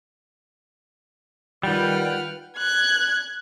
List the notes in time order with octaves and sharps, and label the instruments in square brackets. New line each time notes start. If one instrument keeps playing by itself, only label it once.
[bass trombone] D#3 [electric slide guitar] G3 [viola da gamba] F4 B4 [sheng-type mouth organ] F#5 G5 F6
[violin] F#6 G#6